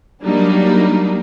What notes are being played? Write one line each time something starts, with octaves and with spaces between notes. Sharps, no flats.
F#3 G3 A#3 D4 D#4